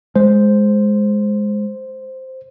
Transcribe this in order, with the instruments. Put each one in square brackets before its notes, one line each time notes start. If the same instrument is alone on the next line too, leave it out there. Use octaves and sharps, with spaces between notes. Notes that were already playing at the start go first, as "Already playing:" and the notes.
[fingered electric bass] G#3 [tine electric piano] C5